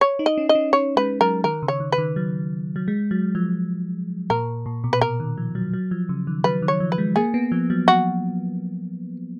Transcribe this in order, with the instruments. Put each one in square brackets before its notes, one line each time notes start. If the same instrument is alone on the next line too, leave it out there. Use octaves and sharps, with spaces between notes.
[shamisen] C#5
[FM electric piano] D#4
[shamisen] D#5
[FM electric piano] C#4
[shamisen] D#5
[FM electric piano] C#4
[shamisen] C#5
[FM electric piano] G#3 [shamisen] B4
[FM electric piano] F#3 [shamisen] A#4
[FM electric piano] D#3 [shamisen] A#4
[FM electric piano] C#3
[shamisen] C#5
[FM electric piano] D#3
[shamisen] B4
[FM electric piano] D#3
F#3
F#3
G#3
F#3
F3
[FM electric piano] A#2 [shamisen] A#4
[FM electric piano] A#2
B2
[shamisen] B4
[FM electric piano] B2 [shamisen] A#4
[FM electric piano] D#3
F3
F#3
F#3
F3
C#3
D#3
[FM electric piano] F#3 [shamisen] B4
[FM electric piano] D#3
[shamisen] C#5
[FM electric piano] F3
[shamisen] B4
[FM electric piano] G#3
[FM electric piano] A#3 [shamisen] G#4
[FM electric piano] B3
F3
F#3
[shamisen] F#4